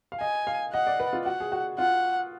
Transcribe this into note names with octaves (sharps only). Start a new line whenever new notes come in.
F5
D#5 G#5
F5
D#5 F#5
D5
B4
F4
F#4 F#5
G#4
F#4
F4 F#5